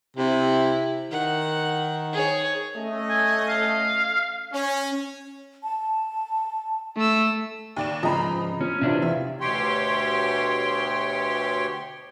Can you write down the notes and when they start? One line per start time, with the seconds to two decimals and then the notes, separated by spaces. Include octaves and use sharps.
0.17 C3 E4
1.11 D#3 F#5
2.13 G#4 C#5
2.77 A3 C#4 D#5
3.10 G#5
3.49 F5
4.53 C#4
5.63 A5
6.97 A3 E6
7.76 D#2 D5 E7
8.03 G#2 C#3 F3 D#5 A#5 B5
8.61 F3 C#4
8.81 C3 E3 C#4 D4 F4
9.02 E2 E5
9.41 D2 B2 G4 C#5 G5 C6